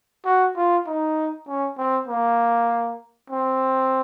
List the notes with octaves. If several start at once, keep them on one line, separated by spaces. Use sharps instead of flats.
F#4
F4
D#4
C#4
C4
A#3
C4